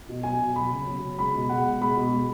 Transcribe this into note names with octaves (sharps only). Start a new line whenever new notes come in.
B2
F#3 G#5
B2
F#3 B5
C#3
F#3
C#3
G#3 B5
B2
G#3 F#5
B2
G#3 B5
B2
G#3